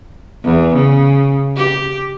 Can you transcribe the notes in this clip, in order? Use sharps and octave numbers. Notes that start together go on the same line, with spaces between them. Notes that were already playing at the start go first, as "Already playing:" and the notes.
E2
C#3
G4